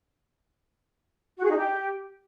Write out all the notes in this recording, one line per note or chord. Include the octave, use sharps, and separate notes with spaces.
F#4
G#4
D#4
G4